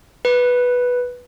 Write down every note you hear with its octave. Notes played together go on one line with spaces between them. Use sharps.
B4